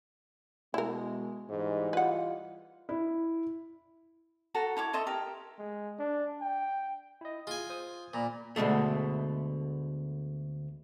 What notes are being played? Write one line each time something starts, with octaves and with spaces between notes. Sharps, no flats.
B2 G#3 E4 A#4
G#2 E3 G3 D#5
F4 B4 F#5
E4
F#4 A4 A#5
E4 C#5 D6
A4 D#5 E5 C6
G4 A#4
G#3
D4
G5
E4 D#5
F4 G#4 G#5
C5 D#6
A#2 D5 A#5 B5
D2 B2 G#3 A3